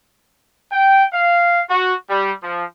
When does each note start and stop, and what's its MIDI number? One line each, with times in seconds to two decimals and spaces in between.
0.72 1.05 79
1.13 1.63 77
1.69 1.94 66
2.10 2.32 55
2.43 2.65 53